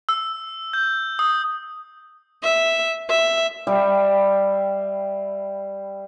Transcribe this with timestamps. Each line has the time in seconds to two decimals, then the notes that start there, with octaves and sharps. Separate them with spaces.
0.09 E6
0.73 G6
1.19 D#6
2.44 E5
3.10 E5
3.67 G3 E5 F5 G5